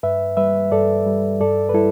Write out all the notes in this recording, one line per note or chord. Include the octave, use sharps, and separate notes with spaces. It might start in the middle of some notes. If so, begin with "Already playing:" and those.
G2 B4 E5
G3 B4 E5
G2 A4 D5
G3
G2 A4 D5
B4
G3 E4 A4